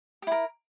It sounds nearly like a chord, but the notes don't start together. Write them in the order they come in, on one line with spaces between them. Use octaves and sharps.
G4 E4 A#4